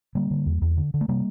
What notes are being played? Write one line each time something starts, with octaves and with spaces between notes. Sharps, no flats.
D3 G3 A#3
D3
E2
E2
D3
D3
A3
C3 G3 A#3